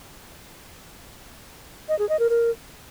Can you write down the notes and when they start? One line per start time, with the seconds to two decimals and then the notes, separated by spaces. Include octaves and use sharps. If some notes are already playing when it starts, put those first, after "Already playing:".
1.89 D#5
1.99 G#4
2.09 D#5
2.19 A#4
2.30 A#4